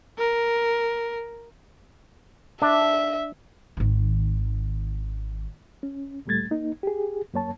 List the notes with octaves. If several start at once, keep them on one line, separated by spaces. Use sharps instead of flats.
A#4
D4 E5
G#1 D#3
C#4
D2 A#2 G3 A3 G#6 A6
A#3 D#4
G4 G#4
F#2 A#3 C#5 A5